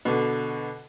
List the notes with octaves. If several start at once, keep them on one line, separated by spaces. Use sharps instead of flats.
B2 D3